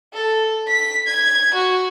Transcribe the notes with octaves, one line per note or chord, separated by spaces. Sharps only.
A4
B6
G#6
F#4